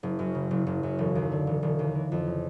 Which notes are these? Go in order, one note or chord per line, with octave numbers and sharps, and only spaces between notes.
F#1
F#2
C#3
F#1
F#1
F#2
E1
D#2
D3
E1
E1
D#2
E3
F2
C#3